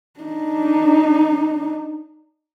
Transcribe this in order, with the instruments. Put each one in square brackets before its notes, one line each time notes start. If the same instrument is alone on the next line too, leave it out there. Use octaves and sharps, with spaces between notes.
[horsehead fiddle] D4 D#4